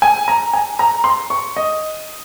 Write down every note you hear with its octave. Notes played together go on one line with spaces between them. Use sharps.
G#5
A#5
G#5
A#5
C6
C#6
D#5